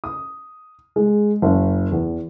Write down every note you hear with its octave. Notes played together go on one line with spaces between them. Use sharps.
D#6
G#3
F#1
E2